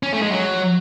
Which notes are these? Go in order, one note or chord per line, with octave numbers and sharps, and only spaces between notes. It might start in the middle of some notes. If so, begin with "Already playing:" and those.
C#4
A3
G#3
F#3